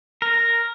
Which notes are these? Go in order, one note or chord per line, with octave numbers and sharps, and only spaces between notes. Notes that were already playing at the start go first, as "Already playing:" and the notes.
A#4